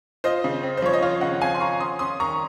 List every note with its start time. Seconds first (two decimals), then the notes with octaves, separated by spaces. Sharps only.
0.24 F4 C5 D#5
0.44 C#3
0.63 C4
0.77 C5
0.82 F3 C#5
0.93 D#5
1.02 F4 C#5 F5
1.21 C#3 D#5 F#5
1.41 C4 F5 G#5
1.55 C6
1.60 F4 A#5 C#6
1.80 C#4 C6 D#6
1.99 C#4 C6 D#6
2.19 D#3 A#5 C#6